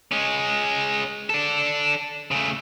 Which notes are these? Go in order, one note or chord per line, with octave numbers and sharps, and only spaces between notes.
G#3 C#4
D4 A4
C#3 A3